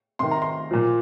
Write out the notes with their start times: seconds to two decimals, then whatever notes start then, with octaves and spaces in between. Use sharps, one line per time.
0.19 C3 D#3 C6
0.31 A#5
0.42 C6
0.71 A#2 F3